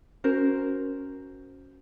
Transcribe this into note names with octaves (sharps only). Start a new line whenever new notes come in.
C#4 F#4 A#4 C5